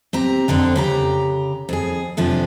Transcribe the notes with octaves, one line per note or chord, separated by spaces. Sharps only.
C4 G4 A#5
F2 D3 C4 D4
C#3 G4 A#5
F2 G#4
F2 C3 F3 C#4 D4